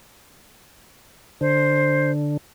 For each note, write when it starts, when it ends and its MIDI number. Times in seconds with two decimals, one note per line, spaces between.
1.41 2.37 50
1.41 2.11 72